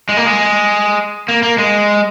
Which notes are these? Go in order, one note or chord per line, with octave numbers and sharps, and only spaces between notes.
G#3
A#3
G#3
A#3
A#3
G#3